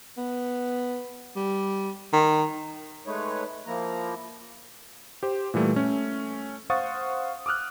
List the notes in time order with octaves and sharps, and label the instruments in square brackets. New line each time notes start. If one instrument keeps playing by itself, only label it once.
[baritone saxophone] B3
G3
D#3
[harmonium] G#3 A3 D#4 B4 C#5
F3 A#3 E4 A#5
[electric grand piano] G4 C5
A#2 E3 G3 A3
A3 C#4
C5 F5 F#5 C#6 D#6 A6
D6 D#6 F6 F#6